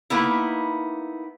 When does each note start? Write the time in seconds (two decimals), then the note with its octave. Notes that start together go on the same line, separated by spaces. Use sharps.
0.10 A#3 B3 D#4 E4